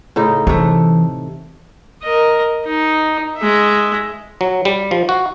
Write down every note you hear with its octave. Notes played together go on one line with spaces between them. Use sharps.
A2 C#3 D#4
C3 E3 A3
A#4 D#5
D#4
G#3 E5
F#3
G3
F3
F#4